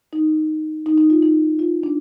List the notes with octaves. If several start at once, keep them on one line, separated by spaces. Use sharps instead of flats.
D#4
D#4
D#4
F4
D#4
F4
D4